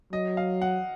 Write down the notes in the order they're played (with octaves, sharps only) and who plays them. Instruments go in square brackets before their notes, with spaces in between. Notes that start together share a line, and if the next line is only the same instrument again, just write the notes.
[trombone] F#3 [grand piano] D#5
[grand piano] F5
F#5